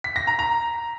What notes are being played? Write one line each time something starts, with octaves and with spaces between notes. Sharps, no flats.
B6
A#6
A#5
A#5